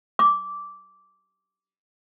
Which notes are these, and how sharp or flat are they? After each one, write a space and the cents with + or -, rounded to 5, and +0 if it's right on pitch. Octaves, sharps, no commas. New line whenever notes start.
D6 -10